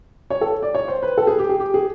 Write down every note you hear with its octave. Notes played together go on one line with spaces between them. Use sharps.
C#5
A4
D5
C#5
C5
B4
A4
G#4
G4
G#4
G4
G#4